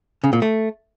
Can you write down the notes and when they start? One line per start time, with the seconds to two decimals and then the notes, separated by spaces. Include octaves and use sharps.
0.24 C#3
0.33 A#2
0.42 A3